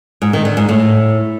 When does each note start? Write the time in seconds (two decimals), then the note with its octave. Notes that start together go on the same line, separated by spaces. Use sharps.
0.22 G#2
0.33 D#3
0.45 D3
0.57 G#2
0.69 A2